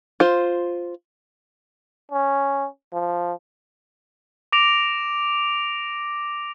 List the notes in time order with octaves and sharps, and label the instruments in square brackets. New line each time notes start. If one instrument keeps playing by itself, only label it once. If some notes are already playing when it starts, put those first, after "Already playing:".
[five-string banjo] F4 C5
[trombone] C#4
F3
[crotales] D6 A#6 D7 F7